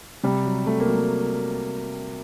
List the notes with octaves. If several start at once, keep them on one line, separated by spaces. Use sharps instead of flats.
C3 G3
F#3
C3 A3
A#3
F#3
A3